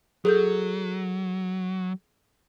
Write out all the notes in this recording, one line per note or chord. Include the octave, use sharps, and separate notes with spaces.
F#3 G#4 A4 G6